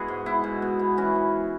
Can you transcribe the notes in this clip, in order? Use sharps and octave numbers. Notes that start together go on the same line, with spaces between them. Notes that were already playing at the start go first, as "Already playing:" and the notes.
Already playing: G#3 B3 E4 F#4 G#4
G#2
B3 E4
B2
B2
B3
E3 C#4 F#4
B3